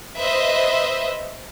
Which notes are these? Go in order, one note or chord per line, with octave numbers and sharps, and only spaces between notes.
B4 C5 D#5 E5